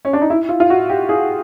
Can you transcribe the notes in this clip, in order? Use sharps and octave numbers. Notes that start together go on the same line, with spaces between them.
C#4
D4
D#4
E4
F4
F4
F#4
G4
G#4